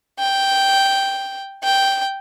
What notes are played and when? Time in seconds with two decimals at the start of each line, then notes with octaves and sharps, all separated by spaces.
0.19 G5
1.64 G5